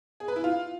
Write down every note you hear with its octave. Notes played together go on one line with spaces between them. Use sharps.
G#4
B4
E4
F4